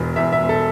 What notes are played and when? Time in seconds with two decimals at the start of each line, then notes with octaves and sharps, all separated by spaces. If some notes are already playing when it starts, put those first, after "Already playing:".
Already playing: E1 E2 E3
0.16 E2 E5
0.32 E5
0.41 E1
0.49 A4